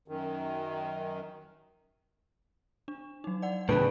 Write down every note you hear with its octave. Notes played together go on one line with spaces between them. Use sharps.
F#2 D#3
D4
F#3 D#4
D5 F#5
A2 C#3 E3 D4 E4 G#4 B4 D7